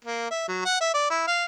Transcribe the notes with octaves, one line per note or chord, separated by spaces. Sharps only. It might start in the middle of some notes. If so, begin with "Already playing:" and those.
A#3
E5
F#3
F#5
E5
D5
E4
F5